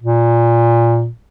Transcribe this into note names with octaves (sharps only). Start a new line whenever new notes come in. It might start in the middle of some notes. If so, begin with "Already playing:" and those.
A#2